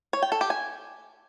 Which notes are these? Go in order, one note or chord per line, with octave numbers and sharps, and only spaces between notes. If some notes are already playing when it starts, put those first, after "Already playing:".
C#5
G5
A4
G4
G#5